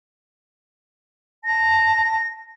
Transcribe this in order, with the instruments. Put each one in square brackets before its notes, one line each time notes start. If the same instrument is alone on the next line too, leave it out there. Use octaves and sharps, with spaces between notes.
[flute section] A5 [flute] A#6